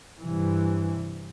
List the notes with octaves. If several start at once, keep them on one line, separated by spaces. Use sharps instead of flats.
G2 C3 E3